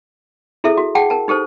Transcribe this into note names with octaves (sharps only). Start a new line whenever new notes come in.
E4 G#4 A4 E5
F#4
G#4 F#5 G5 A5
A#4 A5
D#4 G4 A4 C5